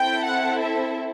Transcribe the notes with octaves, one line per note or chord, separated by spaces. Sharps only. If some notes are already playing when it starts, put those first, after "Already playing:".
Already playing: C4 E4 A4 G5
F#5
E5